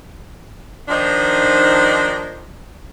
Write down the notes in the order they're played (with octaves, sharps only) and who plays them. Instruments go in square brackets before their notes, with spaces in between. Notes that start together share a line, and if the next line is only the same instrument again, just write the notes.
[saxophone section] D#3 F3 D4 D#4 C5